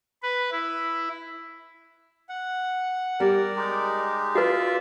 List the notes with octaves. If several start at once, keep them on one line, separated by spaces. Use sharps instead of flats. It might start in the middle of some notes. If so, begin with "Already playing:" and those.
B4
E4
F#5
G3 A#4 D5
G#3 D#4 G4
F4 F#4 B4 D5 E5